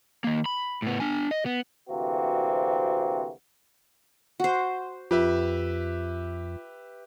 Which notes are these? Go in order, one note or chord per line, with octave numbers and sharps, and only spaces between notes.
D#3 A#3
B5
A2 B3
D4 G#5
D#5
B3
D2 C3 E3 A#3 C4 F#4
F#4 C5
F2 F4 G4 B4 E5